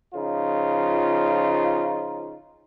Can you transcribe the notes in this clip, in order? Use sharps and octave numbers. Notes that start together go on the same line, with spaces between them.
C#3 F3 D#4 F4